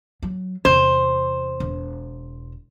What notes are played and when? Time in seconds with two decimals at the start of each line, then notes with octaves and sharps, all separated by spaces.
0.22 F#3
0.65 E2 C3 C5
1.60 E1